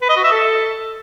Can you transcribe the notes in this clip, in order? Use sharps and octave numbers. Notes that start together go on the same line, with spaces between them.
B4
D#5
F#4
E5
A4